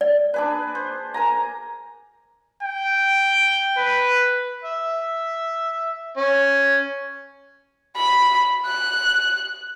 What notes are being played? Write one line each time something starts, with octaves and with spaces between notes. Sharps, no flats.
D5
D4 G#4 B4
C5
A#4 G#5 A#5
G5
B4
E5
C#4
B5
F#6